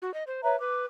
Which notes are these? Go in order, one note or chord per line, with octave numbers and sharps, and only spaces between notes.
F#4
D#5
C5
B4 C#5 E5 A#5
B4 D6